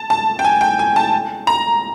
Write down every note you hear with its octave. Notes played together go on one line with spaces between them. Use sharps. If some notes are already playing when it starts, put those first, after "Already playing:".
Already playing: A5
A5
G5
G#5
G5
G#5
A5
A#5